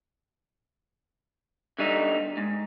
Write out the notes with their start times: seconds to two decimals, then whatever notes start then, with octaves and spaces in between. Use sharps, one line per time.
1.79 D3 G3 D#4
2.37 G#2